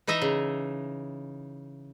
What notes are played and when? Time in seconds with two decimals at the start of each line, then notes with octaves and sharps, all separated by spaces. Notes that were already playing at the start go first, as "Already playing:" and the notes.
0.07 E3 D#4 D#5 E5 A#5
0.22 C#3